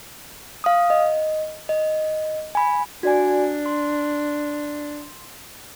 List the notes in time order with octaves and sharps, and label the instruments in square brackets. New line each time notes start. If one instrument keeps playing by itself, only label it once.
[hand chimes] F5 D#6
D#5
D#5
G#5 B5
[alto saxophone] D4 [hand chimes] F#4 D5 G#5
[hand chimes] C6